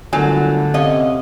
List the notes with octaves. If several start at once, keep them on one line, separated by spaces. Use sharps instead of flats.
G1 A2 D3 F#3 A#4 G#5
C3 C#4 D#5 F5